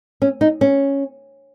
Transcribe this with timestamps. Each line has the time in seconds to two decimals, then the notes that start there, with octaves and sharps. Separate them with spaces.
0.22 C#4
0.41 D#4
0.61 C#4